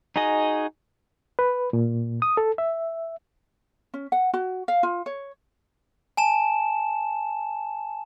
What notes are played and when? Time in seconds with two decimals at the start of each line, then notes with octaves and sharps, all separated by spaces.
0.16 D#4 F#4 G#4 D#5
1.39 B4
1.73 A#2
2.22 D#6
2.37 A4
2.58 E5
3.94 C#4
4.12 F#5
4.34 F#4
4.68 F5
4.83 F4
5.06 C#5
6.17 G#5 A5 E7